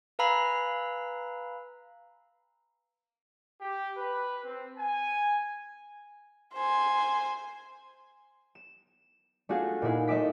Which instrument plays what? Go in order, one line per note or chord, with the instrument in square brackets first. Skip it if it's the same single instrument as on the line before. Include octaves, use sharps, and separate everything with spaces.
[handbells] B4 F5 G#5 A#5 B5 E6
[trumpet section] G4
B4
C4
G#5
[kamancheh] C5 G#5
[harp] E7
A3 D4 F4 F#4 G#4
A#2 D#4 E4 G#4
A3 D#5 E5 D6 B6